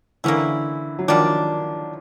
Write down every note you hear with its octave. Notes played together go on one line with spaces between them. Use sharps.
D3 E3 A#3 C#4 E4
F#3
D#3 F3 G3 A#3 D4